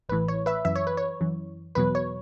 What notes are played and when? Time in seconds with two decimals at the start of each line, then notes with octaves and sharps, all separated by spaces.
0.09 A1 A2 E3 B4
0.28 C#5
0.46 B4 E5
0.65 F#2 E3 E5
0.75 C#5
0.87 B4
0.97 C#5
1.21 F#2 E3
1.75 E2 B2 F#3 B4
1.95 C#5